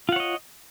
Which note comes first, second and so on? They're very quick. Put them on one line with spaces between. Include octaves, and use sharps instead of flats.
F4 F#5 C#5 D#5